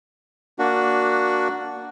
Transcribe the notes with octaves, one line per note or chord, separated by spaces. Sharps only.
A#3 D4 F#4